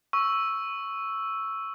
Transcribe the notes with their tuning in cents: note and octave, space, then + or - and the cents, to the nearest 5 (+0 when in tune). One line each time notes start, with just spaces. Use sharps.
C#6 +0 E6 +0